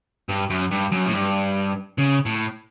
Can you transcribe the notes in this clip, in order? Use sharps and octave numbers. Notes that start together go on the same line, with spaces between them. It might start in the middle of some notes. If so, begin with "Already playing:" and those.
G2
F#2
G2
F#2
A2
G2
C#3
A2